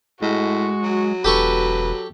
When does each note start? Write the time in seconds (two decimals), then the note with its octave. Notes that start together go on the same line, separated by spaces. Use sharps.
0.22 A2 G#3 F#4
0.83 F#3
1.24 E1 G4 A4 B4 C#6